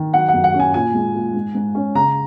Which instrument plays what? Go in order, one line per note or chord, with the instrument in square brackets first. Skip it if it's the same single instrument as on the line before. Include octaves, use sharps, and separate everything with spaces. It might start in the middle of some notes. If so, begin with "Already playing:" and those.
Already playing: [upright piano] D#3
F#3 F#5
F#5
F#2
F#5
C#4
G#5
A#2 G#5
G#3
A#2
G#2
G#2
C#4
C#3 A#5